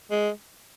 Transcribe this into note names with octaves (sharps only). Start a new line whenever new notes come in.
G#3